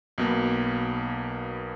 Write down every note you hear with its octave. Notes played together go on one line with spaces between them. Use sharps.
B1 B2 A#3